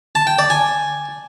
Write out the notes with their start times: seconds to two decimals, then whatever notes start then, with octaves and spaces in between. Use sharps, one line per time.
0.15 A5
0.27 G5
0.39 D5
0.50 G#5